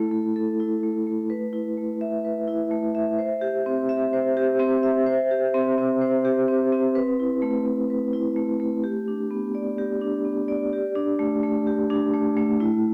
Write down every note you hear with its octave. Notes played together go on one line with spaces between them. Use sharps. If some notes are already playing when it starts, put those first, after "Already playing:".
Already playing: A3 E4 A4
A3
A4
E4
A3
A3
B4
E4
A3
E5
B4
E4
A3
E5
C5
G4
C4
E5
C5
G4
C4
E5
C5
G4
C4
C4
C5
G4
C4
C4
B4
E4
A3
A3
B4
E4
A3
A3
G4
D4
B3
D5
G4
D4
B3
D5
G4
D4
A3
A3
G4
D4
A3
A3
E4